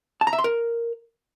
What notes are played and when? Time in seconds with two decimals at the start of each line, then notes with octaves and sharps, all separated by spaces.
0.21 A5
0.27 A#5
0.33 E5
0.39 C6
0.44 A#4